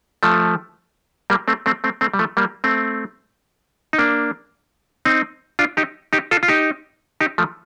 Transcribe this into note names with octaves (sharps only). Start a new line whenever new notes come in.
F3 A3
G3 A#3
A3 C4
A3 C4
A3 C4
A3 C4
G3
F3 A3
G3 A#3
A3 C4
D#4
A#3 D4
C4 D#4
D4 F4
D#4 G4
D#4 G4
F4 A4
F4
D#4 G4
D#4 G4
F3 A3